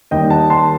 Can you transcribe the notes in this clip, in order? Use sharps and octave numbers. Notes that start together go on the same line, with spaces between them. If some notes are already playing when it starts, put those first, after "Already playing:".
D#2 D#3 G3 D#5 G5
F#5 A5
A5 C6